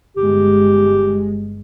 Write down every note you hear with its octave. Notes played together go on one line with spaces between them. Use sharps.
G1 G#3 G4